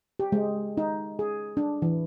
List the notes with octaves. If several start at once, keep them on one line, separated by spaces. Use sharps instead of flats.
G4
G#3
D#4
G#4
D4
E3